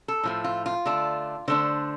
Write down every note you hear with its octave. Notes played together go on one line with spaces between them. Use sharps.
A4
A2 F3 A3
F4
F4
D3 A3 D4
D3 A3 D4 C5